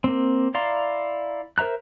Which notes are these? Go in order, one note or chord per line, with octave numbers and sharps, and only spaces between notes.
A#3 C4
E4 D5 F5 A#5 C6
A#4 C5 E5 A#5 F#6